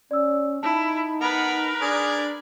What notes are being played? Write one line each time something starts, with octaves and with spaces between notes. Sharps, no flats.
C#4 D5 E6
D#4 E4 A5 B5
B3 A#4 B4
D4 G#4 D5